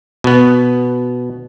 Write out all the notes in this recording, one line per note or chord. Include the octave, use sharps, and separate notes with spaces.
B2 B3